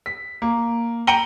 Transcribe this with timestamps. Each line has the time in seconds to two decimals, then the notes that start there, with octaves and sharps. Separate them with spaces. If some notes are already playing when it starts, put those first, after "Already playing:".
0.06 B6
0.42 A#3
1.07 G5 A#5 C#7 D#7 F#7 G7